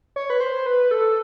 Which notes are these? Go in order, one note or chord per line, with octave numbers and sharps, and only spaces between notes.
C#5
B4
C5
B4
A4